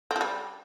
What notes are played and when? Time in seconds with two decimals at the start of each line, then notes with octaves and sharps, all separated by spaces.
0.11 C4
0.16 F3
0.21 G3